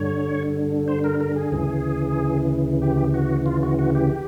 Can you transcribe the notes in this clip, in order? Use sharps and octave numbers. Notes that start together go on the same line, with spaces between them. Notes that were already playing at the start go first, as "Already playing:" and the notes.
Already playing: G2 D3 C#5
C5
A#4
A#4
G#4
D2 C#3 E3
G4
F#4
F4
F#4
F#4
G4